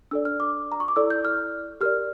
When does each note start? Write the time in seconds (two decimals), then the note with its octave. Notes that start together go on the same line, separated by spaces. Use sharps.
0.11 D4 A4 D5 E6
0.25 F6
0.40 D6
0.72 A#5
0.80 C#6
0.88 D6
0.96 E4 A4 D5 E6
1.10 G6
1.25 F6
1.81 G4 A#4 D5 F6